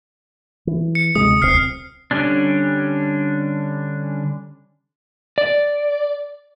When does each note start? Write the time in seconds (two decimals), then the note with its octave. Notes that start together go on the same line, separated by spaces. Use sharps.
0.67 E3
0.95 C#7
1.15 D2 C3 G#3 D#6
1.42 D1 C2 C4 F6 C7
2.11 D3 G3 C#4 D4
5.38 D5